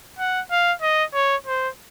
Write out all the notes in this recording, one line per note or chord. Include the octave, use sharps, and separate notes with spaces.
F#5
F5
D#5
C#5
C5